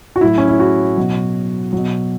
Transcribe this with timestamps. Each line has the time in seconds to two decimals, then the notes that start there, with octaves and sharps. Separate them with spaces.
0.16 F#4
0.21 A2 F#3 E4
0.38 C#4
0.48 E4
0.60 F#4
0.97 B2 F#3
1.73 B2 F#3